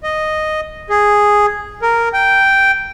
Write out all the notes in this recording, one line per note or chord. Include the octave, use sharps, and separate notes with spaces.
D#5
G#4
A#4
G5